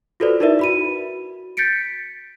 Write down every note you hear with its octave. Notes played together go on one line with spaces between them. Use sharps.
F4 F#4 A4 B4 C5 D5
D#4 E4 A#4 B4 D5 E5
F#4 B5 D#7
G6 A6 B6 C#7 D7